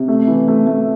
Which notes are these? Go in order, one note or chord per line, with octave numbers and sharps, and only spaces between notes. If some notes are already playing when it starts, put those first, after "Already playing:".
Already playing: C3
A3
E3
A3
A3